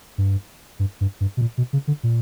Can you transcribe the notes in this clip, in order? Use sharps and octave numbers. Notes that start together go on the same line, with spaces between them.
G2
G2
G2
G2
B2
A#2
B2
C#3
D3
A#2